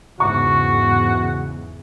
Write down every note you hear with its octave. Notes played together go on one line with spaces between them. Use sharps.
E2 G#2 C#3 F#4 C#6